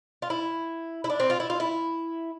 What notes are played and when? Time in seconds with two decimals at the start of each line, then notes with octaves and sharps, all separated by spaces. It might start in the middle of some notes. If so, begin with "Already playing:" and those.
0.22 F4
0.30 E4
1.04 E4
1.10 D4
1.20 C4
1.30 F4
1.40 E4
1.50 F4
1.60 E4